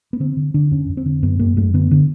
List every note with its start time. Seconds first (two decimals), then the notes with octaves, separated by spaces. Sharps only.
0.13 B3
0.20 D3 C4
0.37 D3
0.54 D3 D4
0.71 F2 C#4
0.89 F2
0.97 C4
1.06 D3
1.23 F#2 B3
1.39 F#2 A#3
1.57 F#2 A3
1.74 D3 B3
1.91 D3